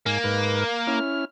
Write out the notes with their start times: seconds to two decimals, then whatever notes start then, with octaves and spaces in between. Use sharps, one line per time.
0.06 G#2 A#3 G#5
0.24 G#2 B4
0.87 C#4 E4 F6